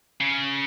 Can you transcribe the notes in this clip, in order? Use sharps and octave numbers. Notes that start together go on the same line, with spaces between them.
C#3